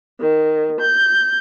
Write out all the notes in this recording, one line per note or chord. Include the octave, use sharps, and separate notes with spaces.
D#3
G6